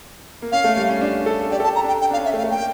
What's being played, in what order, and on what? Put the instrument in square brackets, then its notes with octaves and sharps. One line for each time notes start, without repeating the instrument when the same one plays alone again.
[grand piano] A#3
[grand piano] C#4 [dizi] F5
[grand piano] A3
G3
C#4
D4
A4
[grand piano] G4 [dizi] D5
[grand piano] A4
[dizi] A5
[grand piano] G4
[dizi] A#5
[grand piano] D4 [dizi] G5
[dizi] G5
[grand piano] D4 [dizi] F5
[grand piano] C#4
[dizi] E5
[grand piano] A3
[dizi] F5
[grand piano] A3
[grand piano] A#3 [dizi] G5